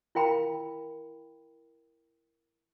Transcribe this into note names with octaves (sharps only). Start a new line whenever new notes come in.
E4 A#4 F5 G5 A#5 B5